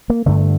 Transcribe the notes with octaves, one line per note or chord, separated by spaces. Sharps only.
A#3
G2 D3 A3